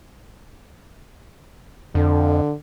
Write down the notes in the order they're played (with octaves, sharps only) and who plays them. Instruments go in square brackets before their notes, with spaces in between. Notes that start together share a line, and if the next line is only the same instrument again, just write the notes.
[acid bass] F2 [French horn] D3